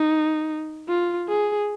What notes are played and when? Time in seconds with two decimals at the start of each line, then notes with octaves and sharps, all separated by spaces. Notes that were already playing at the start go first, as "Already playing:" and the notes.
Already playing: D#4
0.89 F4
1.29 G#4